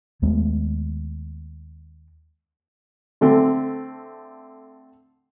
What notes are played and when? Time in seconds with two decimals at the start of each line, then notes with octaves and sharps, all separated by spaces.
0.22 D#2 G#3 A3 B3
3.21 D3 A3 C4